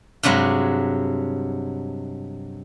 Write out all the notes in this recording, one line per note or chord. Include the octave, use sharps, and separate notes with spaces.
G2 C3 F#3 G#3